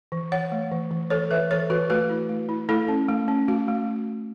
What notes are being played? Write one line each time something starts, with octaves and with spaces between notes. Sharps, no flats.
E3
E3 C#5 F#5
A3
E3
E3
E3 A4 C#5
E3 B4 E5
E3 A4 C#5
E3 F#4 B4
A3 F#4 B4
E4
A3
E4
A3 E4 A4
C#4
A3
C#4
A3 F#4
A3